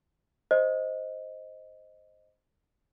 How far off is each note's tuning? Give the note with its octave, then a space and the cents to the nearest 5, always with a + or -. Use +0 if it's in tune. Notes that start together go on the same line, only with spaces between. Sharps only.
C5 +0 D#5 +0